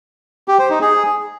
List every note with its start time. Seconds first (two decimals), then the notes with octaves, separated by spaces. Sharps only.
0.48 G4
0.59 C5
0.70 D#4
0.81 G#4